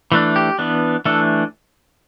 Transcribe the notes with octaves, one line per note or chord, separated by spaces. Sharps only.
E3 A3 D4
G4
E3 B3 D4
E3 A3 D4 A4